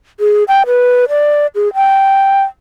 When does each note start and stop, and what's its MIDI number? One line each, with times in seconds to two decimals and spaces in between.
0.20 0.43 68
0.48 0.63 79
0.67 1.05 71
1.09 1.47 74
1.55 1.73 68
1.74 2.42 79